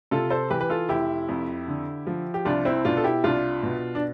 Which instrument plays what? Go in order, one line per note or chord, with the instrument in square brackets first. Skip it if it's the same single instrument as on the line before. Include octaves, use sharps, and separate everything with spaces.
[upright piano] C3 F4 A4
A4 C5
E3 G4 B4
B4
F4 A4
F1 E4 G4
F2
D3
F3
G4
C2 D4 F4
C4 E4
B2 D4 F4
A4
E4 G4
C2 D4 F4
B2
D4